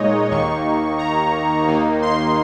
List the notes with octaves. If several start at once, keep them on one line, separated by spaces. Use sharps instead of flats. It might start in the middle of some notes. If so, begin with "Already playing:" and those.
Already playing: A#2 G#3 D#4 C#5 D#5
D#2 D#3 A#3 D#4 C#6
A#5
D#2 D#3 A#3 D#4
C6